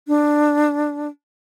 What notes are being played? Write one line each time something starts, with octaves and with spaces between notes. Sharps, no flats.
D4